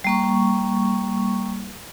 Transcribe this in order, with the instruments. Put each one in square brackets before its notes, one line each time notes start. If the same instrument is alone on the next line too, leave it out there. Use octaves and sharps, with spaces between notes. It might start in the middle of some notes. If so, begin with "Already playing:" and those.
[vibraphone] G3 A#3 C#6